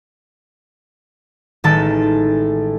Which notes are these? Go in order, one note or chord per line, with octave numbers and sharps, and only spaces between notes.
A1 D#3 G#3 A4 A5